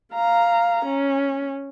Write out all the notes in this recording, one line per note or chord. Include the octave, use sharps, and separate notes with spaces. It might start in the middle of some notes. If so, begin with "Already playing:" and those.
F5 A#5
C#4